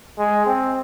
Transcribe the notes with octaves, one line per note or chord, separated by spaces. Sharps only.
G#3
C4